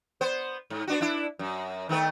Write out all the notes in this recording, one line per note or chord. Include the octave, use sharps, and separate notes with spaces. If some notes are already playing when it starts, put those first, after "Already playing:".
B3 C5
G#2
B3 D4 F#4
D4 E4
F#2
D#3 A3 B3